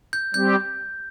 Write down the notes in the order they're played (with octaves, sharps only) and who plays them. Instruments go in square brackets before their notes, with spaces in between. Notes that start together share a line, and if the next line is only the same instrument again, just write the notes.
[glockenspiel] G6
[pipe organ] G3 C4 G4 [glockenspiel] G6